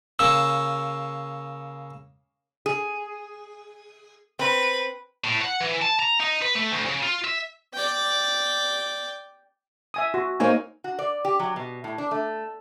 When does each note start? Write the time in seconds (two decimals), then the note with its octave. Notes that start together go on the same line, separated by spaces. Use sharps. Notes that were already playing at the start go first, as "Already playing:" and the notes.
0.19 C#3 A#3 C#4 E6
2.66 G#4
4.39 C4 B4
5.24 A2
5.42 F#5
5.60 E3
5.82 A5
5.99 A#5
6.20 D#4
6.42 B4
6.55 A3
6.71 D2
6.86 C#3
7.03 F4
7.25 E5
7.73 D5 G5
9.94 E5 G#5 D#6
10.14 F#4
10.40 A#3 C4 D#4 C#5 G#5
10.84 F#4
10.99 D5
11.25 G4
11.39 F#3
11.56 B2
11.84 A2
11.98 D4
12.11 A3